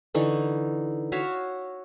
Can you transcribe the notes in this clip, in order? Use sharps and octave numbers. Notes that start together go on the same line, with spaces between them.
D3 E3 D#4 C#6
F#4 C#5 E5 F5